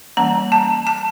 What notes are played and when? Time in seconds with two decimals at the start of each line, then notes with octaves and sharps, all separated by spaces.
0.17 E3 G3 A#3 C#4 A#5
0.52 A5
0.87 A5